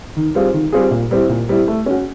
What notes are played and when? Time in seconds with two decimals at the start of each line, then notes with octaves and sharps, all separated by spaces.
0.17 D#3
0.35 G3 C4 F4 G#4
0.54 D#3
0.72 G3 C4 F4 G#4
0.91 A#2
1.11 G3 C4 E4
1.29 A#2
1.49 G3 C4 E4
1.68 A3
1.86 C#4 F#4